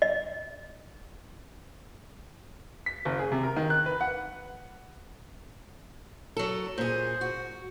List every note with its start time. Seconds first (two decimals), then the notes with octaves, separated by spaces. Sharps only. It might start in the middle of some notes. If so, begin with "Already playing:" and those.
0.02 D#5
2.86 B6
3.05 F#1
3.19 G#4
3.32 C3
3.43 A#4
3.56 D#3
3.70 F#6
3.86 B4
4.01 F#5
6.37 F#3 A4
6.78 A#2 G#4 C5
7.21 F#4